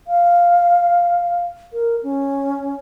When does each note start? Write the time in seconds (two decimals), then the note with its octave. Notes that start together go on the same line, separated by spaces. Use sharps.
0.07 F5
1.73 A#4
2.03 C#4